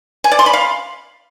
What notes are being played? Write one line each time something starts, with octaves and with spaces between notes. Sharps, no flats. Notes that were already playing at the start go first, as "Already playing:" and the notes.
G#5
D5
C6
B5
F5